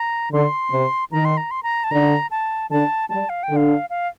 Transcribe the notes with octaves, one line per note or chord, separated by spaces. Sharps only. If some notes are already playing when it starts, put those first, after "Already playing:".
Already playing: A#5
D3 C6
C3
D#3 A#5
C6
A#5
C6
A#5
A5
D3 A#5
A5
D3 A5
G3 A5
F5
G5
D3
F5
F5